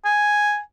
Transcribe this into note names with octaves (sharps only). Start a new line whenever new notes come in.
G#5